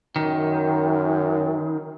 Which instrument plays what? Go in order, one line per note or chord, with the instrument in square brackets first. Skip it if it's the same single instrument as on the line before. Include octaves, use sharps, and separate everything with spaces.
[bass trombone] F#2 [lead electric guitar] D#3